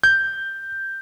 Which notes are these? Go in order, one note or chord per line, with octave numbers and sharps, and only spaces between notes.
G6